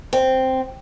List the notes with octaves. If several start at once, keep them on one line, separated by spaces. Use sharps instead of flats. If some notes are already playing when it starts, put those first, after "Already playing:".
C4